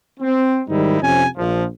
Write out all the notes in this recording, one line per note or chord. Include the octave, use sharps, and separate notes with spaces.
C4
G#2 D#3 G3 D#4 E4
F2 C3 C#4 G#5
A#1 F3